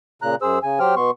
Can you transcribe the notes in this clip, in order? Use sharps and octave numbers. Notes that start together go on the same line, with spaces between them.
A#2 C#3 A#5 F#6
F#2 G#4 C5 E6
C#3 G#5
F#3 G4 C5 G5 F6
B2 B3 C6 C#6